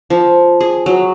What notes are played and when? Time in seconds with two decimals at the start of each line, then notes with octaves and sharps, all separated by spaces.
0.10 F3
0.60 G#4
0.86 F#3